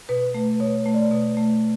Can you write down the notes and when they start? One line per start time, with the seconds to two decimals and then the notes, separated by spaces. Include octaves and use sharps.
0.09 B2 B4
0.34 A3
0.60 B2 C#5
0.86 A3
0.94 D5
1.11 B2
1.37 A3